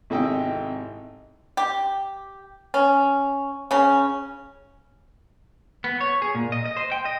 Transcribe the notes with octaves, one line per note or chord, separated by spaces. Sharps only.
G#1 C3 E4 A4 D#5 G5
G4
C#4
C#3 C#4
B3
C#5
G#4
A#2
D#5
D#5
C5
G5
D#5